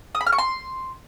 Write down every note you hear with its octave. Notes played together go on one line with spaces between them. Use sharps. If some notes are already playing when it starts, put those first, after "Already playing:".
D#6
B5
F6
C#6
C6